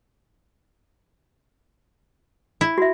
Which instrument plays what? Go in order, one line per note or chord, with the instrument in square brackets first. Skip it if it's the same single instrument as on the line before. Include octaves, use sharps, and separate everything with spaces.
[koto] E4
[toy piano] F#4 E5